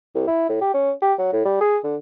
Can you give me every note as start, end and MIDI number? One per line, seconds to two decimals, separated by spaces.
0.15 0.25 36
0.28 0.49 64
0.49 0.59 45
0.61 0.73 67
0.74 0.91 61
1.02 1.13 67
1.18 1.29 54
1.33 1.42 45
1.45 1.56 55
1.61 1.78 68
1.84 1.96 50